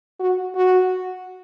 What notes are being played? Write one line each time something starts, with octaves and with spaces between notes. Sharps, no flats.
F#4
F#4